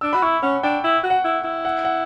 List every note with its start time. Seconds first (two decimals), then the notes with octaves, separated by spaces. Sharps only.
0.01 D4 E6
0.13 F#4 B5
0.22 E4 C#6
0.43 C#4 F#5
0.63 D4 G5
0.84 E4
1.03 F#4
1.10 F#5
1.24 E4
1.44 E4
1.65 F#5
1.85 F#5